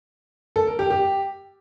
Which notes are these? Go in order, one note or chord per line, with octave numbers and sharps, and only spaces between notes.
A4
A#4
G4
G4